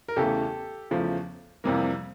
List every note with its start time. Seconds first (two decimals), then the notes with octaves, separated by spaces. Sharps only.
0.08 A#4
0.16 E2 C#3 E3 A3 G4 A4
0.91 E2 C#3 F3 A3
1.64 F2 C3 E3 G3 A#3